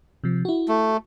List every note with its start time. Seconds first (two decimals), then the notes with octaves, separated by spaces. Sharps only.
0.24 C3 F3
0.45 E4 F#4
0.68 A3